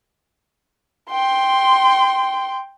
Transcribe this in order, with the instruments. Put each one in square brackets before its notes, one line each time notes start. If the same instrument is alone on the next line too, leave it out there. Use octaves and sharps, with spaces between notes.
[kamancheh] G5 C6